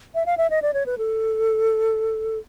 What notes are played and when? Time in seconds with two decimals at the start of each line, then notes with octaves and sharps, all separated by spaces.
0.15 E5
0.26 F5
0.38 E5
0.50 D#5
0.62 D5
0.74 C#5
0.86 B4
0.98 A4